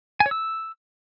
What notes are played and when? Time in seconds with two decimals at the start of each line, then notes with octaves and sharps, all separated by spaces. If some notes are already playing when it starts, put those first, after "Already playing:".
0.20 G#5
0.26 C#5
0.31 E6